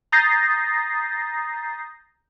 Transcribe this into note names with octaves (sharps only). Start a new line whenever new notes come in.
A#5 D#6 G6 A6 A#6 C7